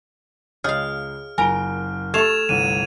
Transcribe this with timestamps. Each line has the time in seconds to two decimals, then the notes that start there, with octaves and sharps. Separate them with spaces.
0.64 C#2 G#4 C#5 D#5 F5 F6
1.38 F#1 F4 A#4 G#5 D7 G7
2.14 A3 G4 A4 C#6 G#6 E7 F7
2.49 G1 C2 D#7